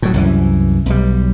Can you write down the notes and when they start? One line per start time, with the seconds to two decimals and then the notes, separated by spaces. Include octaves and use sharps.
0.02 A2 F#3
0.14 C2 F#2 E3
0.86 B1 G3